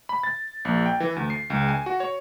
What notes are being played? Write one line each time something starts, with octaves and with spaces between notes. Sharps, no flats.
B5
A6
A#1
G5
E3
D2
C7
C#2
G#5
F#4
C#5